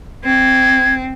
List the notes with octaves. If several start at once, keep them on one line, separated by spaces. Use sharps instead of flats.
C4 G#6